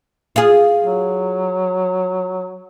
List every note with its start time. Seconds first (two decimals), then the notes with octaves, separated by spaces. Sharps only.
0.36 F4 G#4
0.83 F#3